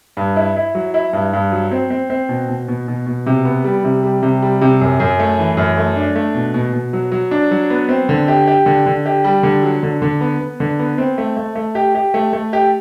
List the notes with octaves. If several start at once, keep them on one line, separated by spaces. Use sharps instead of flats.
G2
E4
E4
F#3
E4
G2
G2
F#3
C4
C4
C4
B2
B2
B2
B2
B2
C3
B3
G3
C3
G3
C3
G3
C3
F#2
F#2
A3
E3
F#2
A3
D4
A3
B2
B2
B2
F#3
F#3
D4
F#3
B3
C4
D3
G4
G4
D3
D3
G4
G3
D3
F#3
D3
D3
B3
B3
D3
B3
C4
A3
A3
A3
G4
G4
A3
A3
G4